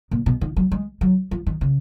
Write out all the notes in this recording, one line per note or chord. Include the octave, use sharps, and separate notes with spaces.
A#2
B2
D#3
F#3
G#3
F#3
F3
D#3
C#3